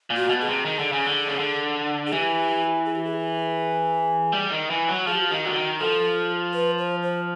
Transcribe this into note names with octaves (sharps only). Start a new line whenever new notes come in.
A#2
F#4
B2
G#4
C3
D#3
D3
C#3
D3
C#3
D3
G#4
E3 G4
G#4
G4
G#4
G3
D#3
E3
F#3
F3 G#4
G4
F#4
D#3 G4
D3 F#4
D#3
F3 A4
B4
C5
C5